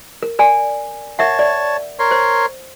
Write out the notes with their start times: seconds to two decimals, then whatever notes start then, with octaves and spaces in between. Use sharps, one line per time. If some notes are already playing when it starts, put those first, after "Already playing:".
0.23 A#4
0.39 A#4 D5 G#5
1.19 A#4 C#5 E5 F#5 A5
1.39 D5
1.99 A#4 C#5 C6
2.11 C5